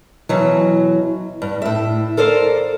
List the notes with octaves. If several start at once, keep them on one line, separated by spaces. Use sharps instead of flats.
B2 E3 F#3
G2
A2 E5
A4 A#4 C5 D5 F5